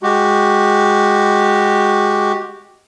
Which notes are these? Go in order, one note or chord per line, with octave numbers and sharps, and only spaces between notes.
G#3 F#4 G4